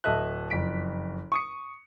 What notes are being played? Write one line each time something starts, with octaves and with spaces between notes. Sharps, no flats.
D1 A4 D#5 E5 F#6
F#1 F2 B6 D7
C#6 D#6 C#7